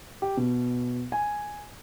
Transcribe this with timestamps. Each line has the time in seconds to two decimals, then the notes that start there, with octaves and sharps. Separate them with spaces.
0.22 G4
0.37 B2
1.12 G#5